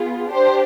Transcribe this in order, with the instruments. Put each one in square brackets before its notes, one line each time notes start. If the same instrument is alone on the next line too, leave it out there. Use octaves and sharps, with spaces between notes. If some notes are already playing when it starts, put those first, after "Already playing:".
Already playing: [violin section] B3 F4 G#4
D4 G4 C5